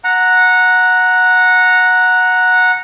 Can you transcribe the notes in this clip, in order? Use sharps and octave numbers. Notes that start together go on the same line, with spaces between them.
F#5 A#5